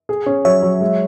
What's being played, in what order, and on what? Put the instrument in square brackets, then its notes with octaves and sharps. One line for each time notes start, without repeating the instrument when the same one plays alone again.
[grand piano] G#4
C#4
[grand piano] F#3 [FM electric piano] C#5 E5
[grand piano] F#3
G#3